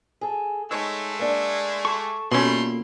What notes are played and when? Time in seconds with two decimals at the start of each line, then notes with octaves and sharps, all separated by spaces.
0.21 G#4 A4
0.71 G#3 A3 D#4 A4 C#5 E6
1.19 A#3 D4
1.85 A4 C#6 D6
2.32 B2 G3 A3 A#3 C#4 F4 B5 C6